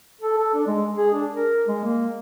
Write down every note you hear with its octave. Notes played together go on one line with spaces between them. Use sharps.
A4
A4
D4
G#3
G#4
D4
A#4
G#3
A#3